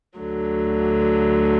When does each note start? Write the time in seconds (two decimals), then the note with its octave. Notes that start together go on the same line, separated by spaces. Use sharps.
0.18 D2 D3 F#3